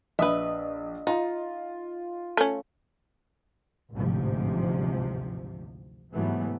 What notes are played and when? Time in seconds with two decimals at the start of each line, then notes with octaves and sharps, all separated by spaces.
0.19 A#1 B4 D#5 E5 D#6
1.07 D#4 F4
2.37 A3 C#4
3.94 A1 D2 G#2 C3 F3
6.13 G#2 C3 E3 F#3 A3 B3